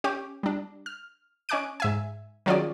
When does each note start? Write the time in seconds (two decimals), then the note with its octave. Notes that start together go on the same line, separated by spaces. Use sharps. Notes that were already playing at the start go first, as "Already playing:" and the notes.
0.04 C#4 G4 D6
0.43 G3 D4
0.86 F6
1.49 C#4 D#5 G#5 D6 F#6 D7
1.80 G#2 E5 G#5
2.46 D#3 F#3 C#4 F4 G#4 D5